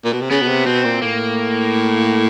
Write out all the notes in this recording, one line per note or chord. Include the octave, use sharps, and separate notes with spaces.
A#2
B2
C3
C#3 B3
B2
C3
B2 C4
A#2
A2 A#3